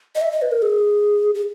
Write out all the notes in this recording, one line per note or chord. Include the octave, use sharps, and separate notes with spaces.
D#5
E5
D#5
B4
A#4
G#4
G#4